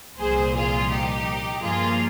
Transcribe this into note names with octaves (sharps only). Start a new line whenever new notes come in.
C2 A#2 F3 G#4 C5
F4 G#4
D#4 G4
G2 F3 A#3 F4 G#4